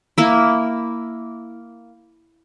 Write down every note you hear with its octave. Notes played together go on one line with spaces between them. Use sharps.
A#3 E4